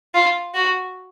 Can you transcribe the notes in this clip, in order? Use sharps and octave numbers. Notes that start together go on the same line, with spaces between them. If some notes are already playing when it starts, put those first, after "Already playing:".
F4
F#4